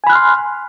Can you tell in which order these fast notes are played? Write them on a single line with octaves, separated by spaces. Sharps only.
G#5 B5 F#6 F6 C6